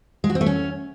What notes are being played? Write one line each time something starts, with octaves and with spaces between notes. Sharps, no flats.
G#3
F#4
C4
A3
C#4